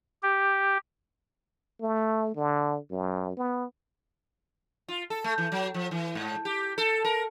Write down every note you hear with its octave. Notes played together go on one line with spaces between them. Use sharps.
G4
A3
D3
F#2
B3
F4
A4
A3
E3
F#3
F3
E3
G#2
G4
A4
A#4